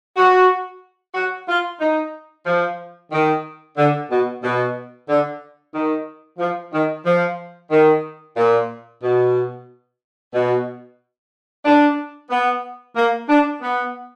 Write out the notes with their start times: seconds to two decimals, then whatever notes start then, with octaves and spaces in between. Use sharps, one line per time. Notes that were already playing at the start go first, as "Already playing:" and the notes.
0.16 F#4
1.14 F#4
1.48 F4
1.80 D#4
2.46 F3
3.11 D#3
3.77 D3
4.09 B2
4.43 B2
5.08 D3
5.74 D#3
6.39 F3
6.73 D#3
7.05 F3
7.71 D#3
8.36 A#2
9.03 B2
10.34 B2
11.65 D4
12.30 B3
12.96 A#3
13.29 D4
13.62 B3